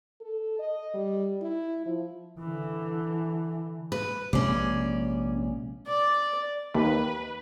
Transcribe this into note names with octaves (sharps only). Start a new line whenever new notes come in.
A4
D#5
G3
E4
F3
D3 E3
B4
A#1 C3 G#3 C#4 D5
D5
D#2 B4